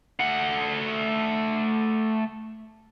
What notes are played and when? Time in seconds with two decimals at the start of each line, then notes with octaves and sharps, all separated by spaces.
0.20 A3 F#5